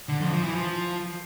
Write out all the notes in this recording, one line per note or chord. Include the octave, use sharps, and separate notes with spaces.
D3
F2
F3
E3
F3